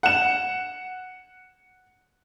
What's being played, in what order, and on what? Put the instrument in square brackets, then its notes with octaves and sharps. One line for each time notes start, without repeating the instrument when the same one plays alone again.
[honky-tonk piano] F#5 E7